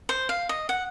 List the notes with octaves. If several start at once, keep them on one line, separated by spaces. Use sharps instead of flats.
C5
F5
D#5
F#5